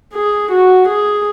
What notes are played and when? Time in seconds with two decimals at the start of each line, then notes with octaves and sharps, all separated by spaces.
0.14 G#4
0.52 F#4
0.88 G#4